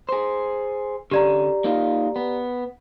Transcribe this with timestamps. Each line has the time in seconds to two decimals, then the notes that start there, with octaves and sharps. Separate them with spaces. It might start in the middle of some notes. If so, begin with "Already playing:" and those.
0.09 G#4 C5
1.11 D3 C#4 G4 D5 A#5
1.64 A#3 D#4 F4
2.16 B3